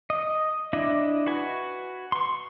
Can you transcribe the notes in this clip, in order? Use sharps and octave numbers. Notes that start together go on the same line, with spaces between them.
D#5
D4 E4 D#5
F#4 B4 G#5
C6 C#6